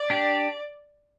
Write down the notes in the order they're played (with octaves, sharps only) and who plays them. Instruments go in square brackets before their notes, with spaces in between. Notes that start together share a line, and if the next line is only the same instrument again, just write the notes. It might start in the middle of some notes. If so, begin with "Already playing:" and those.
Already playing: [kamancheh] D5
[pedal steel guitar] D4 G4